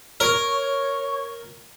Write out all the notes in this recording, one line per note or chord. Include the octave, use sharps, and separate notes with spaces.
A#4 C#5